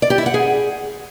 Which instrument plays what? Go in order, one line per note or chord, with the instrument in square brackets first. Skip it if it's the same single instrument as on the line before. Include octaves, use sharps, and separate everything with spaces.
[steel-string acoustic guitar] D5
G4
E4
F#5
G#4